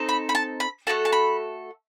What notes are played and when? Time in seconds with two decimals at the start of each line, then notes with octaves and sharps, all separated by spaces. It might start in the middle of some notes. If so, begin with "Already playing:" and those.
Already playing: C4 D#4 A4
0.09 B5
0.29 B5
0.35 A5
0.60 B5
0.87 A3 D#4 F#4 A4 A5
1.05 A5
1.12 B5